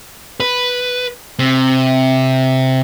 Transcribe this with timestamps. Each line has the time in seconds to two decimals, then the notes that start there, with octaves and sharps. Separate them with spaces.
0.40 B4
1.39 C3